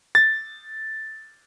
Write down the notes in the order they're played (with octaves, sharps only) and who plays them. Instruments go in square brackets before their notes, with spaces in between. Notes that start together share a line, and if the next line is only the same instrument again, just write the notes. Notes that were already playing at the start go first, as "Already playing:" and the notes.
[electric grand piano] A6